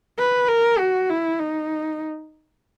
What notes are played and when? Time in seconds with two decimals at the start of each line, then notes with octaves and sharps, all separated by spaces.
0.18 B4
0.48 A#4
0.79 F#4
1.09 E4
1.39 D#4